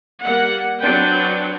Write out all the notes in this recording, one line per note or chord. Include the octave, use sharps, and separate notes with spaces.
G3 A#3 F#5
F#3 C4 D4 B4 G5